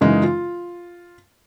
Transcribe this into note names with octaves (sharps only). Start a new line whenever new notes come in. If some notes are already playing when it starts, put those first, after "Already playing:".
F#2 C#3 E3 G#3 D#4
F4